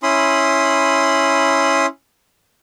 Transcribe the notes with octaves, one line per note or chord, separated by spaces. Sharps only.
C#4 E4 B5 C6 D#6